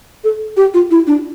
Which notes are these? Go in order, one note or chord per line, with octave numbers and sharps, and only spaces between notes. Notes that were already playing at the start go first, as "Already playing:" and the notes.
A4
G4
F4
E4
D4